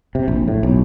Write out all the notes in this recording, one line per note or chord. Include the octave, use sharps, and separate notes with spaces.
C3
A#1
A2
B1